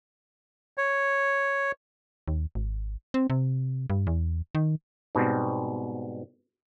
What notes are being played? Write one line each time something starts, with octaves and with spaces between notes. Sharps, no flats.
C#5
D#2
G#1
C4
C3
G2
E2
D#3
G#2 B2 G3 C4